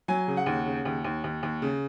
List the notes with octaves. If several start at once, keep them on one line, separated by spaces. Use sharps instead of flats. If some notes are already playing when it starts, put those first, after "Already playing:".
F#3 G#5
C#3
F#5
D#2
C#3
D#2
D#2
D#2
D#2
C#3